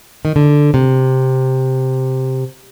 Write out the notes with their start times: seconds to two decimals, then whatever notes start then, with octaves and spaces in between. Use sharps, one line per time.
0.25 D#3
0.36 D3
0.74 C3